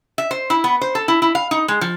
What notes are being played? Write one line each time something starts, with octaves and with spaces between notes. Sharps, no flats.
E5
C5
E4
B3
C5
A4
E4
E4
F5
D#4
G#3
F3